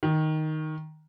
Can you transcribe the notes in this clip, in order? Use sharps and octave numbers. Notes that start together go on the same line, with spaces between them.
D#3